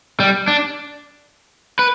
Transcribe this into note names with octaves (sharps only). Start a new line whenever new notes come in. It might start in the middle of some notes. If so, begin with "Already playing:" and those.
G3
D4
B4